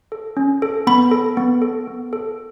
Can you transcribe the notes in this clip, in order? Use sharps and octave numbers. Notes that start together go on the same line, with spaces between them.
A4
C#4
A4
B3 B5
A4
B3
A4
B3
A4